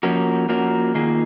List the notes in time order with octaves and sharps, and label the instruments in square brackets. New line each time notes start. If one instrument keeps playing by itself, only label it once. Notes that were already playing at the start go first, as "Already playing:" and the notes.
[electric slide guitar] F3 A#3 C#4 F#4 A#4
F3 A#3 C#4 F#4 A#4
D#3 A#3 F4 G#4